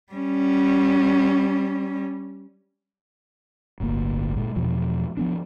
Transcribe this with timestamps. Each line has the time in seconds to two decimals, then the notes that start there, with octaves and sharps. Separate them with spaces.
0.12 G3 C#4
3.80 D1 G1 D2 A#3
4.37 A#2 G#3
4.56 E2 B2 F3
5.17 F3 B3 D4